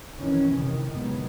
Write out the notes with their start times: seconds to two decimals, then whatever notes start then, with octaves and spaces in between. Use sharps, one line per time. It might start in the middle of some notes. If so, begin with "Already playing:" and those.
0.16 F2 D#3 E3 C#4
0.51 C3 D#3 E3
0.92 A2 C3 D#3 F#3 G#3 B3